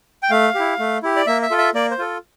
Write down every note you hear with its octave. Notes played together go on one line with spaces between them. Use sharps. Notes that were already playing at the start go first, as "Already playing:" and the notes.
G5
A3 F5
E4 G4
A3
E4 G4
D5
A#3 E5
E5
F4 A4
E5
A#3 D5
C5
F4 A4